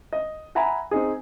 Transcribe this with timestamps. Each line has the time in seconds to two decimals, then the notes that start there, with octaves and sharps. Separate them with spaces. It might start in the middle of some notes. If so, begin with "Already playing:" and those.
0.13 D#5
0.55 E5 F#5 G#5 A#5 B5
0.91 C4 D#4 G#4